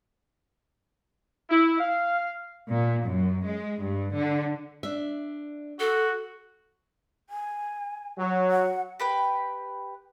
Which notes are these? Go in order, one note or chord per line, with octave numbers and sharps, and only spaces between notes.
E4
F5
A#2
F#2
G#3
G2
D3
D4 E5
F#4 A4
G#5
F#3
F#5
G4 B4 G5